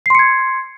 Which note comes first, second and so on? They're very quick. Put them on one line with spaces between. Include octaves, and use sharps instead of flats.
C7 C6 C#7 G#6